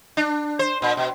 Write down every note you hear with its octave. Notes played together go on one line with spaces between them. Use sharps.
D4
C5
A#2
B2